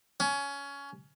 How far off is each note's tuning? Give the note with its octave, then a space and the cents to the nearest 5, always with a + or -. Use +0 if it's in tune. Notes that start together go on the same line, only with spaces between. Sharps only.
C#4 +20